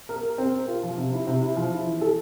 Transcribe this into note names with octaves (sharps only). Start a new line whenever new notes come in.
A#4
A#4
C4
A#4
F4
F3
C3
E4
C3
E4
F3
E4
E3
A4